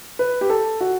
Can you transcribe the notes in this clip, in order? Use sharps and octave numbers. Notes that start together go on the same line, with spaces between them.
B4
G4
A4
F#4